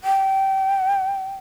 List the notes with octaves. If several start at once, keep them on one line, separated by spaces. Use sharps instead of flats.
G5